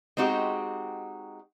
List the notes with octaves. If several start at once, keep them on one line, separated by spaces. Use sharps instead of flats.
G#3 C4 D#4 F#4 G4